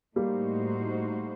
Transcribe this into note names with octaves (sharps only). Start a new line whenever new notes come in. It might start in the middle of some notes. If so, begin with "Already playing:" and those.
A2 G3 A3 A#3 D#4 F#4 C5